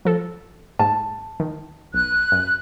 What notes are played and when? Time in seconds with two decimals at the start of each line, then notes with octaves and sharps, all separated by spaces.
0.05 F3 A4
0.79 G#2 A5
1.40 D#3
1.94 B1 F#6
2.32 F#2